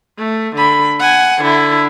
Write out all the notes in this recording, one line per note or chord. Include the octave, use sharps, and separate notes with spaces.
A3
D3 B5
F#5 G#5
D3 E4